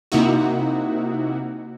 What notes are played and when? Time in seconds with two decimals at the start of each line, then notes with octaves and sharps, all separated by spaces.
0.12 C3 A#3 D#4 E4 F#4